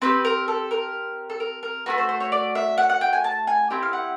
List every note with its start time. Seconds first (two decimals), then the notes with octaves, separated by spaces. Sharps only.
0.02 C4 E4 G4 B4
0.25 A#4
0.48 A4
0.71 A#4
1.30 A4
1.40 A#4
1.63 A#4
1.86 A3 C#4 F#4 B4
1.98 C5
2.09 C5
2.20 C#5
2.32 D5
2.55 E5
2.78 F#5
2.89 F#5
3.01 G5
3.13 G#5
3.24 A5
3.47 G#5
3.70 C4 E4 G4 G5
3.83 F5
3.93 F#5